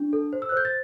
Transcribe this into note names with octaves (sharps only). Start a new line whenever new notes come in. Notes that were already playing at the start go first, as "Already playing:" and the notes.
Already playing: D4
A4
C5
E6
F#6
C5 G6
A6